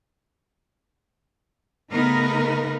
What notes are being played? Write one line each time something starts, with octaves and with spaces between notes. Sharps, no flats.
C#3 A3 B3 D#4 A#4 B4